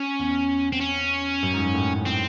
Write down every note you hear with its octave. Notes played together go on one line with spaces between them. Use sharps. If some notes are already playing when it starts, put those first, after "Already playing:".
Already playing: C#4
E2
C4
C#4
F#2
G#2
F#2
A2
C4